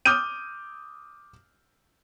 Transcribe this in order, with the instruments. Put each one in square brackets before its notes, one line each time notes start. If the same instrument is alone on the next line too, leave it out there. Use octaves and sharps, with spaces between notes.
[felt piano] D6 D#6 F6 G6 D#7